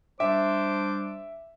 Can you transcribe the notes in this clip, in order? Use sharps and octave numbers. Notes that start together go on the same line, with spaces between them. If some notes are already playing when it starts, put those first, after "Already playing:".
G3 D4 C5 E5 D6